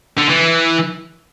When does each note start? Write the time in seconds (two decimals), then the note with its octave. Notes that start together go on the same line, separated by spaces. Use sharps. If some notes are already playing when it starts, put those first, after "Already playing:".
0.18 D3
0.30 E3